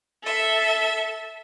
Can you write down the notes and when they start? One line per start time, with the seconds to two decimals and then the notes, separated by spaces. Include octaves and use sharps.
0.23 A4 E5